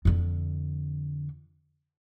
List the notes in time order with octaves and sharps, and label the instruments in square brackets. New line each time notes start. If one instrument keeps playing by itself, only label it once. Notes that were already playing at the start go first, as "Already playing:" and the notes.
[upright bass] F2 D3